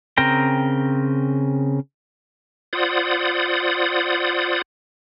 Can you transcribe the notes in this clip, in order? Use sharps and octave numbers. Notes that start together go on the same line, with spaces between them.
C#3 C4 A#4 G5 A#5
F4 C5 D5 F#5 D#6